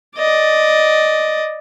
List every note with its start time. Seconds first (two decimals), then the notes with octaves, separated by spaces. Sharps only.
0.17 D5 D#5